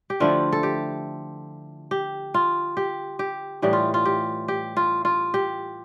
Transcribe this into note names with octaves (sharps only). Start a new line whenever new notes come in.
G4
D3 F3 A3 E4 F4
A4
G4
G4
F4
G4
G4
A2 E3 G3 G4
F4
F4
G4
G4
F4
F4
G4